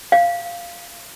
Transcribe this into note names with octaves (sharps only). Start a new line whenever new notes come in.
F5